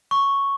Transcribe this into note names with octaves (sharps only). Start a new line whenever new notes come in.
C#6